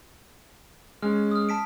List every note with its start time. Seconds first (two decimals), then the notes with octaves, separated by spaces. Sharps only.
1.02 G#3 C#4 F6
1.31 D#6 F6
1.49 A5 B6 D7